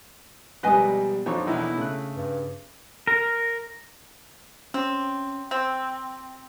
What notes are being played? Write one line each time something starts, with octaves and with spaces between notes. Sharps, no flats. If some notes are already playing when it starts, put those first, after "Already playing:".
A#1 G#2 B2 G3 B4 D#5 G#5 D#6
F2 F3 B3 D4 D#4 A4 C#5 C#6
A#1 E2 B2 D#4 E4
C#3 A3 F#6
G2
A#4
C4 C#4
C4 E6